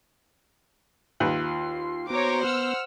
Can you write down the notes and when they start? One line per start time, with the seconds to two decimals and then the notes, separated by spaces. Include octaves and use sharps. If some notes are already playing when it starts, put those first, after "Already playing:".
1.20 D#2 F4 B4 C6
2.10 B3 F#4 C5 C#5 A#5 D6
2.44 B3 F#5 E6 F6